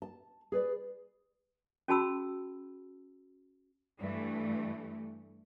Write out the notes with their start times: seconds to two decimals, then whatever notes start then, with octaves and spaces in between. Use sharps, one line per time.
0.02 A5
0.52 G#4 B4 D5
1.88 C#4 F#4 G#4 A5 B5 E6
4.00 G2 E3 A3